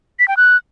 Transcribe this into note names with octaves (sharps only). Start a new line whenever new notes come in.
B6
G5
F#6